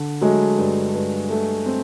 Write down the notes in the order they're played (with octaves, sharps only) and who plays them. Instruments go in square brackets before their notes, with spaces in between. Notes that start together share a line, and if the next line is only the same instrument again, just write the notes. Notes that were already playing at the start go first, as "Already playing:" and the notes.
Already playing: [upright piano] D3
[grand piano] F#3 G#3 [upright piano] A3
[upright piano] G2
G2
A3
C4